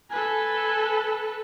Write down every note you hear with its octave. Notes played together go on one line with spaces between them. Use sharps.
A4 B4 G#5